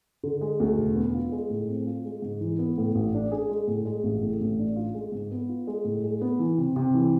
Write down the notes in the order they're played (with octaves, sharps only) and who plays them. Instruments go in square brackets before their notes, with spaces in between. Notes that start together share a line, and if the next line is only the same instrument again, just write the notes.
[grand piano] D3
G#3
D2
E1
B3
F4
G#3
A2
C4
F4
G#3
G#2
E3
B3
A2
A1
D4
G#4
G#3
A2
G#3
A1
A2
A1
D4
F4
G#3
G#2
B3
F4
G#3
A2
G#3
B3
E3
C3
C3
E3